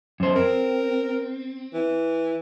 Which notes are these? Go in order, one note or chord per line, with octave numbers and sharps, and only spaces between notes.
F#2 C5
C4 A#4
E3